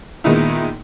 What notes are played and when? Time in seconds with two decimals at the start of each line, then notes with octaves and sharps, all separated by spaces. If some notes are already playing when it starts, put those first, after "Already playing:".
0.24 A#2 D#3 G#3 B3 D#4 E4